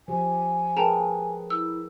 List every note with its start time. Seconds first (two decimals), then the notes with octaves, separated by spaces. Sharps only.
0.08 F3 G4 G#5
0.77 G#4 A#4 B4 G5 A5 A#5
1.50 E4 E6